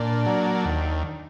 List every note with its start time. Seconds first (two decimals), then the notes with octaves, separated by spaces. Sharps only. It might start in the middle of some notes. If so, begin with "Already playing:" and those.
Already playing: A#2 D4 D5
0.26 F#3 A#3
0.65 D#2